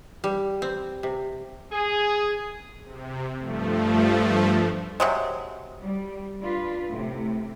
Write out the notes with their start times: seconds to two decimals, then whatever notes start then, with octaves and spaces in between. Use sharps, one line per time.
0.24 G3
0.62 C4
1.03 C3
1.71 G#4
2.84 C3
3.39 G2 F3 A3
5.00 C3 F#3 G#3
5.82 G3
6.40 D4 F4 B4
6.88 A2 C3